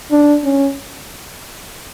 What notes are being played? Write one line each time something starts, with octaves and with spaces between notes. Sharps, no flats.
D4
C#4